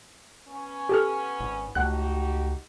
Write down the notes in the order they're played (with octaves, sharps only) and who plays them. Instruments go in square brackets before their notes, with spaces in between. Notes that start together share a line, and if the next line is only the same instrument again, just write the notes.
[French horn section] B3 C#4
[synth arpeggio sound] G4 A4 F6
[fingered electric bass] G#1
[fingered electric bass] C#2 A3 [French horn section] D#4 F#4 G4 [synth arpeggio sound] F#5 F#6